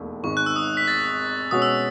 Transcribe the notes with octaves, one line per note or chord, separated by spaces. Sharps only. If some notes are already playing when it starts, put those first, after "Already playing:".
Already playing: E1 D#2 A3
G#1 G#2 D#3 G#3 C#6
F#6
E6
D#6
B6
A6
B2 G#3 C#4 F#4 D#6
E6